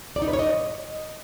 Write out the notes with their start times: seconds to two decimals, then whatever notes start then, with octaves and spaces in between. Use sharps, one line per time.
0.16 D5
0.22 D#4
0.28 B4
0.33 C#5
0.39 D#5